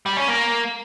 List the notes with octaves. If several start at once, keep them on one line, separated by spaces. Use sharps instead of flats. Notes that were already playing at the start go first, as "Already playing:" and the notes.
G3
C#4
A#3